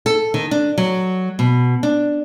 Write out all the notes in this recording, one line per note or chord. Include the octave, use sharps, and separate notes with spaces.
A4
D#3
D4
F#3
B2
D4